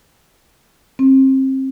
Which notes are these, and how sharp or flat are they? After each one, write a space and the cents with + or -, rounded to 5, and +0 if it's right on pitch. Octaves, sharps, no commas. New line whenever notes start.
C4 +30